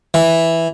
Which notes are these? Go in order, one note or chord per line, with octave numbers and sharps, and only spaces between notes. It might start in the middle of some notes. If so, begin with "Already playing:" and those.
E3